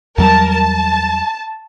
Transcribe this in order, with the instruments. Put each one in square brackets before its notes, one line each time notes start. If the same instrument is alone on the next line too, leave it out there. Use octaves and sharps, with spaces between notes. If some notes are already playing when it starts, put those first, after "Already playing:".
[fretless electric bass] E2 F#3 G3 [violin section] A#4 A5
[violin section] A5